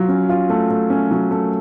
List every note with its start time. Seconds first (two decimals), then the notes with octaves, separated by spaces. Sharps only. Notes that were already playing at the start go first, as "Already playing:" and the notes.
Already playing: F#3 F4
0.09 C#4
0.29 F4
0.50 A3
0.70 A3
0.90 C#4
1.11 F#3
1.31 A3